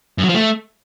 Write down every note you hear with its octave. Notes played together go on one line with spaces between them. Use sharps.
F#2
F#3
F3
A3